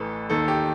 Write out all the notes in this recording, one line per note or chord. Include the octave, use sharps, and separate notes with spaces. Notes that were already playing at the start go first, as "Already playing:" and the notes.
Already playing: A1 A2 E3 A4 B4
D#2 D#3 A4
G4